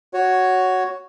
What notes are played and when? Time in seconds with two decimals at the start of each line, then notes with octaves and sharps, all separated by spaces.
0.14 F#4 C#5